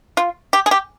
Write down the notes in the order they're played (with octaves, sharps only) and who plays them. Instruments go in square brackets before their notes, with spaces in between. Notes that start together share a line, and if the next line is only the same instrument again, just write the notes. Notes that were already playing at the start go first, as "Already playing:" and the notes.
[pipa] F4
G4
G#4
G4